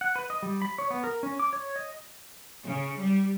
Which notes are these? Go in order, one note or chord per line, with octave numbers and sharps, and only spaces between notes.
F#5
B4
D#5
G3
B5
C#5
B3
A#4
C#4
D6
C#5
D#5
C#3
G3